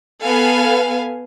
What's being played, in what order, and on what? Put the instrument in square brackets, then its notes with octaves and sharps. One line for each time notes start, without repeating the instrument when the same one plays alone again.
[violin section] B3 A4 F5 G#5